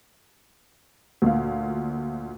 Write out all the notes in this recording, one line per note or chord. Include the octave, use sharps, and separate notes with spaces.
D2 A#2 F5